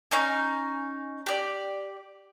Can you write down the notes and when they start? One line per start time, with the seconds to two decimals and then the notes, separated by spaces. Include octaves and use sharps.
0.11 C#4 D#4 G#5
1.26 G4 D5